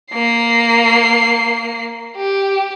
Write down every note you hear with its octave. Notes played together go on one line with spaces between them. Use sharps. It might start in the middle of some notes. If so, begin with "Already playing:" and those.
A#3 C7
G4